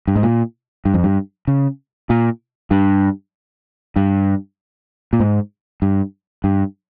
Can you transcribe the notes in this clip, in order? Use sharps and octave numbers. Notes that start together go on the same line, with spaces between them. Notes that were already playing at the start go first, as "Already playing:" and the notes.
G2
G#2
A#2
G2
F2
G2
C#3
A#2
G2
G2
A#2
G#2
G2
G2